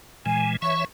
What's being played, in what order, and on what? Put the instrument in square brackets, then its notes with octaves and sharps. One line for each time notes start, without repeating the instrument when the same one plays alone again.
[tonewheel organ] A#2 E3 G#3 [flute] G#5
[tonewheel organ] E3 C#5 E5 [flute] C#6